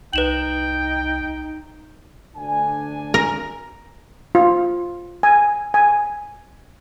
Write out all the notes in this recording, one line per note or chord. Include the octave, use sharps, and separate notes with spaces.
C2 D#4 B4 G5 E7 F#7
D2 D4 G#5
A#4
F4
G#5
G#5